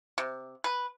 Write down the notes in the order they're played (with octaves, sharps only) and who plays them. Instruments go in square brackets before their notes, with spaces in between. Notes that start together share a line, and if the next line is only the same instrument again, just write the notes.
[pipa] C3
B4